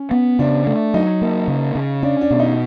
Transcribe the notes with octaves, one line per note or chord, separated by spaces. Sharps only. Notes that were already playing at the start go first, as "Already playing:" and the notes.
Already playing: C#4
B3
C#3 D4
A3
F#3 D#4
A#3
C#3
C#3
C#4 D4
D4
B2
D#4